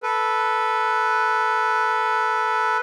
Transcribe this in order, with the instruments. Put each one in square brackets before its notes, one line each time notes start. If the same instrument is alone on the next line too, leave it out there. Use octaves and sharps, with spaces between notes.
[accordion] A4 B4